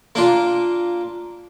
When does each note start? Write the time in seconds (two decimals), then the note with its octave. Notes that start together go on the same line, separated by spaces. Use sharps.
0.15 A#3 D4 F4